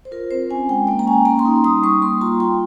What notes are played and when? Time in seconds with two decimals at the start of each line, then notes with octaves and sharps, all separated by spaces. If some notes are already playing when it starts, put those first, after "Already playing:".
0.05 C5
0.11 F4 A#4
0.31 C4 C5
0.49 C#4 G#5
0.68 G#3 G5
0.87 A#3 G5
0.99 A#5
1.07 C#4 G#5
1.25 A#3 A#5
1.39 C6
1.45 D#4
1.64 G3 D#6
1.83 G3 C#6
2.02 A#3 C6
2.21 F4 A#5
2.40 F4 G5